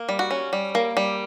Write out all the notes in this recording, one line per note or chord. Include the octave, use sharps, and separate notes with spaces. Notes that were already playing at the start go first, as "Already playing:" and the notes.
Already playing: A#3
G3
F#4
C#4
G3
A#3
G3